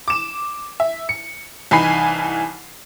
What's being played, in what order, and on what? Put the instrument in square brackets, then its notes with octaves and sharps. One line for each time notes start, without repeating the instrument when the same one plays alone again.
[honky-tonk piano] D6 E7
E5
C#7
C2 E3 D#4 G#5 B5 C7